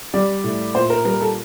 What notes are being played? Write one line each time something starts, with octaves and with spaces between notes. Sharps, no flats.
G3 D5
A2
A#2 C5
A#4
G3 A#4
A4